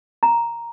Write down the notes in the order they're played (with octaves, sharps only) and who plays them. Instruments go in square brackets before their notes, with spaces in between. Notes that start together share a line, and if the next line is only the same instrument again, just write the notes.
[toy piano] A#5